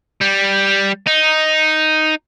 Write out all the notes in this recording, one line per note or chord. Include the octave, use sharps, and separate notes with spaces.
G3
D#4